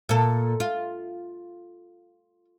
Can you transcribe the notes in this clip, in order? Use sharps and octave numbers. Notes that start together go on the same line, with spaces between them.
A#2 A4
F4